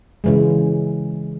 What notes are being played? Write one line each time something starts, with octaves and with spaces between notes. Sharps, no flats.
C#3 E3 G#3